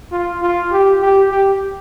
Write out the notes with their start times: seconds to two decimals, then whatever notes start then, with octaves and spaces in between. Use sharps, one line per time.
0.12 F4
0.42 F4
0.72 G4
1.01 G4
1.30 G4